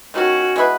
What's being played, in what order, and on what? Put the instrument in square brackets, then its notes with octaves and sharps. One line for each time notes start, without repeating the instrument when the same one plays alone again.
[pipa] D#3 G#3 C#4 [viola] F#4
[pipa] G#3 B3 E4 B4